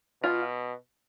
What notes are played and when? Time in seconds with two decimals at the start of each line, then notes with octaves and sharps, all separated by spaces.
0.23 B2 F4